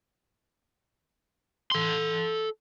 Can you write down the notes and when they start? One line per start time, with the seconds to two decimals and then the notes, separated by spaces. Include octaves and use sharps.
1.72 A4 C6